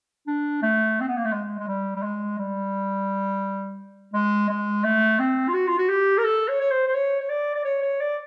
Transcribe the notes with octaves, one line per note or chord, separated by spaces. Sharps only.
D4
A3
C4
B3
A#3
A3
G#3
G#3
G3
G3
G#3
G3
G#3
G#3
A3
C4
F4
F#4
F4
F#4
G4
A#4
A4
C#5
C#5
C5
C5
C#5
C#5
D5
D5
C#5
C#5
D5